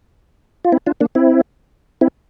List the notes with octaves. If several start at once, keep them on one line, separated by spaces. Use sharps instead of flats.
F4
C4 E4
D4 F4
A#3 D4
C4 E4
C4 E4